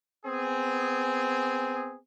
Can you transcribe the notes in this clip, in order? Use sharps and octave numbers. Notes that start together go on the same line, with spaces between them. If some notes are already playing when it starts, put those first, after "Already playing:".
B3 C4 G#4